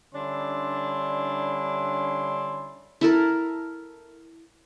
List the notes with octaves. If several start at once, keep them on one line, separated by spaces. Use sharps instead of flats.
D3 G3 C#4 D4 E4 C6
E4 A4 A#4